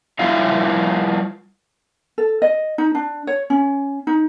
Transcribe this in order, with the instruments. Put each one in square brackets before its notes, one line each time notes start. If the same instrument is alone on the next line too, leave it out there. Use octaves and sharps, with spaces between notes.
[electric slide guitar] G3 E4 F4 E5 F5
[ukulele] A4
D#5
D#4
D4
C#5
C#4
D#4